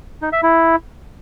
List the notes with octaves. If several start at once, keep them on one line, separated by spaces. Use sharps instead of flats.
D#4
E5
E4